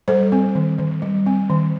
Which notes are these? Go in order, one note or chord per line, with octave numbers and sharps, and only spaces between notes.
G3 A4 C5
C4
D#3
D#3
G3
C4
D#3